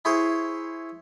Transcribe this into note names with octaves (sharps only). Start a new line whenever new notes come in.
E4 G#4 C5 C#5